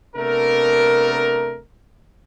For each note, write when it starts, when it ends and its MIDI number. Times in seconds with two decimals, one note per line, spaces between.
0.16 1.59 48
0.16 1.59 57
0.16 1.59 59
0.16 1.59 62
0.16 1.59 70